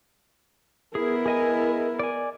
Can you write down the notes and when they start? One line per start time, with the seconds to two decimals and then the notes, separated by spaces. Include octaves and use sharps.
0.95 B3 E4 G#4 A#4
1.26 G#4 D#5 G#5
1.99 D5 G#5